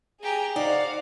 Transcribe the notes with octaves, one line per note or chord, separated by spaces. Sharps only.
G4 G#4 G#5 A#5
D#4 F#4 C5 D5 F5 F#5